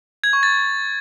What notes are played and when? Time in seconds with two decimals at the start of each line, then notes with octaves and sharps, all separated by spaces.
0.24 G#6
0.33 C#6
0.43 A6